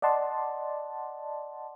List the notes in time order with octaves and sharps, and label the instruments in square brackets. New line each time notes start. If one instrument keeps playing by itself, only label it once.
[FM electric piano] D5 D#5 F#5 A5 C6